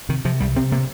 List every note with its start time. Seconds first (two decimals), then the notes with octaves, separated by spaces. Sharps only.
0.09 C3 D#3
0.25 C3 F3
0.40 C2 G3
0.56 C3 C4
0.72 C3 A#3